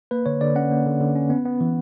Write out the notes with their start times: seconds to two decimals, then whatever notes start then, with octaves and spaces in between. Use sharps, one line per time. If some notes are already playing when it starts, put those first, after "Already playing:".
0.11 A#3 B4
0.26 D3 C#5
0.41 D3 D5
0.55 C#4 F#5
0.71 A#3
0.86 D3
1.01 D3
1.15 C#4
1.30 B3
1.45 B3
1.61 E3